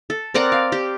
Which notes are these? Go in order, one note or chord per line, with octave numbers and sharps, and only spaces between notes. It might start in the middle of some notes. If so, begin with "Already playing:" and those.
A4
C4 A#4 D5 F#5
F5
G4